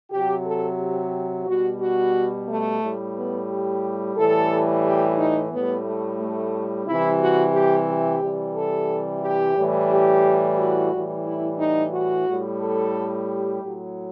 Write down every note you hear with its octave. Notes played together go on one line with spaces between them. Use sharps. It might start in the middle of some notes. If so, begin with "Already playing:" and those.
C3 F#3 G4
A4
G4
B2 G3 F#4
F#4
A3
A2 G3
B3
G4
A2 E3 G3 A4
G4
D#4
A2 G3 B3
A3
A3
C3 E3 G3 E4
F#4
G4
G4
C3 E3 G3
A4
G4
A2 E3 G3
G4
F#4
A2 E3 G3
E4
D#4
F#4
A2 G3
A4
G4
A2 F#3